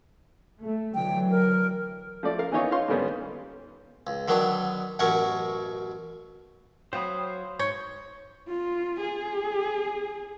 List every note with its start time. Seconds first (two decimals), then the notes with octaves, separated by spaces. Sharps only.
0.60 A3
0.94 D3 E3 F#3 G5
1.30 A#4
2.23 F3 A3 D5
2.39 A#4 F5
2.52 E3 B3 C#4 D#4 F4 C#5
2.71 D#4 F4 C#5 F5 C6
2.88 G#2 D3 D#3 G3 B3 C#4
4.07 C#2
4.28 D3 D#3 F#3 B3 D4
4.99 A1 F#2 B2 F#3 A#4 C#6
6.93 F#3 C5 F5 G5 B5 D#6
7.23 C#5
7.59 G#2 C#5 G6
8.48 F4
9.00 G#4